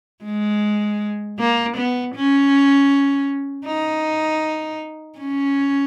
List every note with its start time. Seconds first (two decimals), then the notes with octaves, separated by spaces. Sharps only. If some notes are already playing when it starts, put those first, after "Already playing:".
0.24 G#3
1.39 A#3
1.77 B3
2.15 C#4
3.66 D#4
5.19 C#4